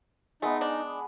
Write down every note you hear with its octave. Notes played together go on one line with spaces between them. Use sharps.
G#3 A3 B3 D#4
D4